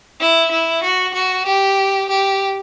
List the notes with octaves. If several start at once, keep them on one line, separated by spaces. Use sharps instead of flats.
E4
E4
F#4
F#4
G4
G4